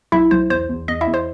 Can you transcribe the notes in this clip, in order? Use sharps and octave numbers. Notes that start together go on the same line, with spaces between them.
B1 E4 E5
B1 C5
E2 C5
E2
E2 D#5
E4 E5
E2
C5 C6